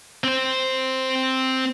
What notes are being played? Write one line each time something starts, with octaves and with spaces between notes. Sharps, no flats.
C4 C5